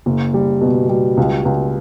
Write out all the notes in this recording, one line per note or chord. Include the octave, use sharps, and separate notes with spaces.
F#1
G3
B2
G3
C#2
C#2